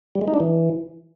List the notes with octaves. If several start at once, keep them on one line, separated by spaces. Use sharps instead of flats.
G3
G#3
D#4
D4
E3